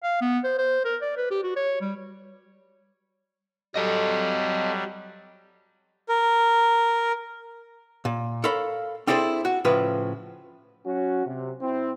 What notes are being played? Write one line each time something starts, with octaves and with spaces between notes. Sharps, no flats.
F5
B3
C5
C5
A#4
D5
B4
G4
F#4
C#5
G3
F#3 G3 A4 D#5
A#4
A#2
A4 A#4 C#5 F5 B5
C4 D4 E4 G#4 A4 C5
F#4
A2 C#3 F3 B4
F#3 C#4 F#4
C3
C4 E4